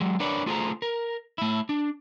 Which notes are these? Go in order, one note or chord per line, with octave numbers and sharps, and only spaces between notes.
F#3 G#3
D4 A#4 B4 C#5 D5
A3 F4 G#4 A4 C5 A#5
A#4
A3 E4
D4